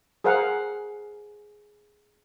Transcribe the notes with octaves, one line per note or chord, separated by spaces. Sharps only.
G#4 A#4 C5 F5 F#5